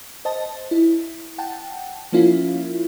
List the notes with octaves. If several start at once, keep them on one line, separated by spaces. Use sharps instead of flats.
C5 D#5 A5
E4
F#5 G5 A5
F3 A#3 C#4 E4 F4